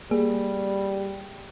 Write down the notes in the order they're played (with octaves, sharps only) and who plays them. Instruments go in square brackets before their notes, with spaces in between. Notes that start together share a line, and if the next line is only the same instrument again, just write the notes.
[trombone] G3 [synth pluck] A#3 G#4